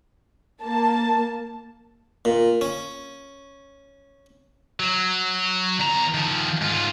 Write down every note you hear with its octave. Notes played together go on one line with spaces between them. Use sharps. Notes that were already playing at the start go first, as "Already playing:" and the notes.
A#3 A5
A#2
C#4
F#3
E2 A#5
D#3 F3
G#2 F4